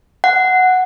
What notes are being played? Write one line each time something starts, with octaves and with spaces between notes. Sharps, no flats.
F#5